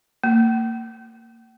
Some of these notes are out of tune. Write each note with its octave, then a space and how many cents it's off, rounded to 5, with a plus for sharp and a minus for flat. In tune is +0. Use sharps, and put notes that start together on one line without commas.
A#3 -35